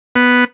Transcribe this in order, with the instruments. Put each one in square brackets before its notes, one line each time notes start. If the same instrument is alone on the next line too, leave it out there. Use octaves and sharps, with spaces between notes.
[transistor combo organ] B3